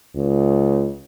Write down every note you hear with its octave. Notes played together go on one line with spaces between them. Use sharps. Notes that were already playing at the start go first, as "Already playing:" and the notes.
C#2